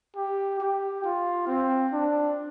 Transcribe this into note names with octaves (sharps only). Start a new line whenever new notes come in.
G4
G4
F4
C4
D4